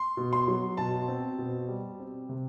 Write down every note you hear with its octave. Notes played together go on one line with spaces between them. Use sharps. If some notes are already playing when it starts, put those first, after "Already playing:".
Already playing: C6
B2
C6
F#3
B2 A5
C4
B2
G3
C4
C3